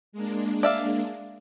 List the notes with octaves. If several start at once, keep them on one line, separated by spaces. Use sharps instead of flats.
G#3 A#3 D4
D5 E5 F5